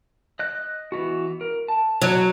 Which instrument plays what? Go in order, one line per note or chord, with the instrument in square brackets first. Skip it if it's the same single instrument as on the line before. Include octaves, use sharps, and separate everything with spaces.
[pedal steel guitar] D#5 F#6
E3 B3 F#4
A#4
A5
[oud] F#3 [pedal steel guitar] D5